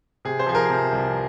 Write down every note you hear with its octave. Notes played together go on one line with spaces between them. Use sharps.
C3 G#4
C5
F3 G#4
A#4
C3
C2